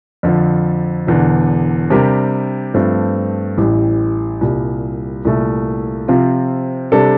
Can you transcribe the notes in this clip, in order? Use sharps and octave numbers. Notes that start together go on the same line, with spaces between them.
F2 D3 F3
E1 E2 D3
C3 G3 D4 G4 A#4
G2 F3 A3 C4
A1 A2 E3 G3
C2 A#2 G3
C2 A#2 A3
C3 F3 C4 F4
C3 G3 D4 A4